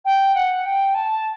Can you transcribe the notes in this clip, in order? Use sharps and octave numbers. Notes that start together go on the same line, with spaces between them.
G5
F#5
G5
A5